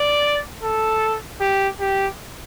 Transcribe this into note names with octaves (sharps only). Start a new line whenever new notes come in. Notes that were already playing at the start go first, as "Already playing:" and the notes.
Already playing: D5
A4
G4
G4